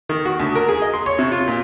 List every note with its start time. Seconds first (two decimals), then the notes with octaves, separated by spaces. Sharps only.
0.09 D#3
0.25 F#4
0.40 D2
0.55 A#4
0.68 G#4
0.82 D#5
0.94 C6
1.06 C#5
1.19 C3
1.32 F4
1.48 A#2